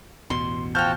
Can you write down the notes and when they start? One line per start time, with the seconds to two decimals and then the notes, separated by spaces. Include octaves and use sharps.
0.30 A1 E2 B2 C6
0.75 F3 F#4 F5 G5 A5 F6 G6